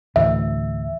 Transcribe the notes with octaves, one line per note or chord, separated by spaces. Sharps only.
D2 A2 E3 E5